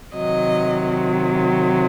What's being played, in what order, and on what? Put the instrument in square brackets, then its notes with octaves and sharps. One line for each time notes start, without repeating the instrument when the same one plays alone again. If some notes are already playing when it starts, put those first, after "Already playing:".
[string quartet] C3 D#3 F#3 D#5